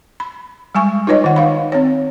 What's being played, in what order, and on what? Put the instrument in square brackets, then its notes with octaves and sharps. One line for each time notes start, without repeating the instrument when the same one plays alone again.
[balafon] B5
G3 G#3 G#5 C#6
D#4 F4 B4 C#5 D#5
D#3 F#5
D#4 F5 B5
C4 C#5